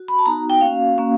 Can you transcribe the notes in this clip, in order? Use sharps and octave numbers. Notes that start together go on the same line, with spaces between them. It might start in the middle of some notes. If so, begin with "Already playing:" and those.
Already playing: F#4
B5
A5
B3 D#4 F#4 A#5
G5
A#3 C#4 F#4 F5
A#3 C#4 F#4